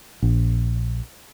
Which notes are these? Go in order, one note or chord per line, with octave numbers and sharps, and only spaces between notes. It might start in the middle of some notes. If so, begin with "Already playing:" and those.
A#1